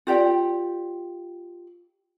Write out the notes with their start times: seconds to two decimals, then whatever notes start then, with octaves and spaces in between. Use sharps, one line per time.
0.07 F4 G4 D5 G5